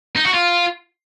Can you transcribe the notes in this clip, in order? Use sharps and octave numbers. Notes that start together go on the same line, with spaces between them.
D#4
F#4
F4